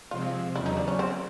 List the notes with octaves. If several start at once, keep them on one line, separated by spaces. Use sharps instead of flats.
C3 F3 G#3 C4 F4
E2 C#3 F#3 B3 E4
D#4
D4
C#4
C#3 C4